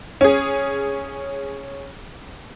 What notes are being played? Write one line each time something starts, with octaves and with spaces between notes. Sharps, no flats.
C#4 G#4